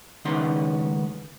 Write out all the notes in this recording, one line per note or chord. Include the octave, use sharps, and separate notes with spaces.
C#2 D#3 G#3 B3 C#4 C6